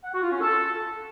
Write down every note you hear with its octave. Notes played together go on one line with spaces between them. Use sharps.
F#5
F#4
F4
C#4
A4